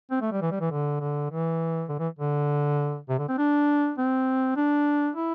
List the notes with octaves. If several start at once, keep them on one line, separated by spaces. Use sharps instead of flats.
C4
A3
G3
E3
G3
E3
D3
D3
E3
D3
E3
D3
C3
D3
C4
D4
C4
D4
E4